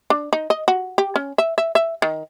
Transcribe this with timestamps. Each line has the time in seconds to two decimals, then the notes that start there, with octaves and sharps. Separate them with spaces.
0.10 D4
0.33 D#4
0.50 D#5
0.68 F#4
0.98 G4
1.16 C#4
1.38 E5
1.58 E5
1.75 E5
2.02 D#3